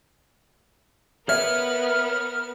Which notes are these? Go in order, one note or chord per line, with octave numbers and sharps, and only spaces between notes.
B3 A#4 B4 C#5 E5 F6